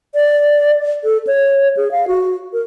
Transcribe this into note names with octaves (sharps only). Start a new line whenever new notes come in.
D5
A4
C#5
G#4
F5
F#4
A#4